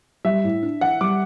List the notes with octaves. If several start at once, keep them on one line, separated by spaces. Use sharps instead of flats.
G3 E5
A2
D4
E3 F#5
G3 D6